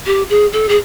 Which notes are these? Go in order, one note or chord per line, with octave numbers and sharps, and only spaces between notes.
G4
G#4
A4
G#4